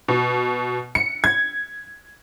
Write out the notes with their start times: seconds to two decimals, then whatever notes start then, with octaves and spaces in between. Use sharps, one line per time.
0.08 B2
0.95 C#7
1.24 G#6